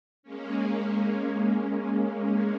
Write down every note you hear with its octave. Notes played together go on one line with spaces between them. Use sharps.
G#3 A#3 C#4